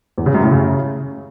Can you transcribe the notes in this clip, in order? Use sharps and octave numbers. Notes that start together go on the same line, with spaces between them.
E2
C#3
F#2
A2
C#3